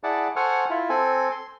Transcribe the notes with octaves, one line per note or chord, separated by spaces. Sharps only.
E4 G#4 D5 F#5 A5
A4 C5 F#5 G#5 C#6 F6
E4 F4
C4 A4 G#5
C6